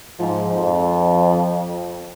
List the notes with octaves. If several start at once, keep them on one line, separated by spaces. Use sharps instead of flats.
G#2 F3
F2